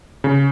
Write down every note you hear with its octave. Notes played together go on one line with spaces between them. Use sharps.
C#3